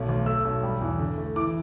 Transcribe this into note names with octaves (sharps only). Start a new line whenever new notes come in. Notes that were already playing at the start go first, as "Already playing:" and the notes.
Already playing: B1 A3
D2
A3 E6
B1
G3
E2
D3
A3
E3 D6